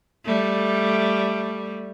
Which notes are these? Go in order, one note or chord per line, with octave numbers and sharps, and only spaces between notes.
G3 A3